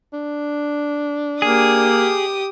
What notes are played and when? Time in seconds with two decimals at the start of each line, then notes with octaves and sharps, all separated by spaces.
0.13 D4
1.42 A#3 G4 G#4 D#6